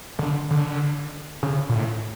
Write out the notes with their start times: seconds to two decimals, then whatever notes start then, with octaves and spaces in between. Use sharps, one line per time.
0.19 D3
0.51 D3
1.43 C#3
1.69 A#2
1.75 A2